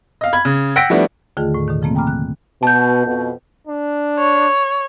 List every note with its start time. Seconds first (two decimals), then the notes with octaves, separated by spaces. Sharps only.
0.21 D#5 F5
0.33 B5 G#6
0.45 C#3
0.76 F#5 G5 E6 A#6 B6 D7
0.90 F3 G3 A3 B3 D4 E4
1.37 D#2 D3 D#3 A3 F4 G#4
1.55 A2
1.68 B2 D3 D#3
1.82 C#3 F3 A3 A#3 C4
1.95 G5 G#5 A#5 B5 D6 F6
2.07 F#6
2.63 B2 A5 G6
3.07 F2 B2
3.67 D4
4.19 C#5